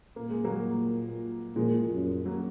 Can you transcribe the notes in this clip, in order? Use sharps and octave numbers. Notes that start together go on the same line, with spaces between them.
A#2 A#3
G#3
F#3 A#3
A#2 F3 G#3
F#2
F#3 A#3